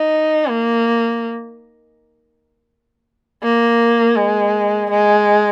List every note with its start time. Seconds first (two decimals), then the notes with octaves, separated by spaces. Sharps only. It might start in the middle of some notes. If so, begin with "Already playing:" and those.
Already playing: D#4
0.49 A#3
3.43 A#3
4.16 G#3
4.90 G#3